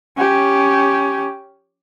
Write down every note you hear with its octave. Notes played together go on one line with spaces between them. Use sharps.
C#4 G4